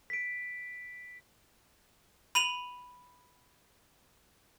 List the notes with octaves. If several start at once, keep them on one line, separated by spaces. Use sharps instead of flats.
B6 D7
B5 D#7 F7 F#7